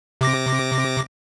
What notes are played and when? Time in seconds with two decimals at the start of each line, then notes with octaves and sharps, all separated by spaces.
0.21 C3 D6 A#6